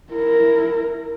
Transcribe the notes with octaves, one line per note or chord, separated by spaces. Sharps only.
E4 A#4